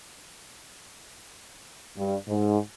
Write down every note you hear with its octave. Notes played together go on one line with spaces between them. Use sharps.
G2
G#2